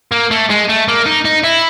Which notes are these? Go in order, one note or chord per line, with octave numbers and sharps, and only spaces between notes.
A#3
A3
G#3
A3
A#3
D#4
D#4
E4